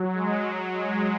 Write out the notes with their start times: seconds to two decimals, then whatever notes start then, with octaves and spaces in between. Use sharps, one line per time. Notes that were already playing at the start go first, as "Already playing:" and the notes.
Already playing: F#3
0.14 G#3
0.43 F#3
0.73 G#3